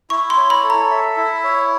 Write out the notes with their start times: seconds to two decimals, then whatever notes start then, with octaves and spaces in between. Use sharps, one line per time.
0.10 E4 C#6
0.30 C6
0.37 C#5
0.50 B5
0.64 A4
0.70 A#5
0.91 E5
1.17 E4
1.44 C#5